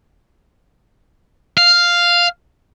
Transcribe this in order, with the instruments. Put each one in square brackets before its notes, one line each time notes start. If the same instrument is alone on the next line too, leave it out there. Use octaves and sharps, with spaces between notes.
[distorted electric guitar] F5